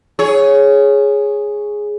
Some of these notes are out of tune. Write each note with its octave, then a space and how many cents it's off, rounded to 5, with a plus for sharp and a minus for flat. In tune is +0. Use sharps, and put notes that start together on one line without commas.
G#4 +0 C#5 +0